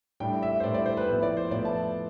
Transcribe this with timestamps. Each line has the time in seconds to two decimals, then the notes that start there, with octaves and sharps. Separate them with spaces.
0.20 A2 G3 D4 G5
0.43 E5
0.60 C5
0.64 A2 G3 D4 D5
0.74 D5
0.86 C5
0.97 B4
1.08 A2 F3 B3 E4
1.23 D5
1.37 C5
1.51 A2 F3 B3 E4 D5
1.65 A5